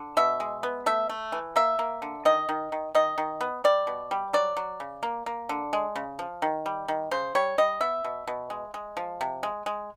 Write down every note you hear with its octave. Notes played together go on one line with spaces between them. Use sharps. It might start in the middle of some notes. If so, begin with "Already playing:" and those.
Already playing: D3
B2 E5
G#3
B3
A3 E5
A3
E3
A#3 E5
A#3
D3
D#3 D#5
D#3
D#3
D#3 D#5
D#3
B3
G3 D5
B2
G3
F#3 D5
F#3
C#3
A#3
A#3
D3
G#3
C#3
F3
D#3
G3
D#3
C#3 C5
G3 C#5
G3 D#5
B3 E5
B2
B2
G#3
G#3
F3
C3
G#3
G#3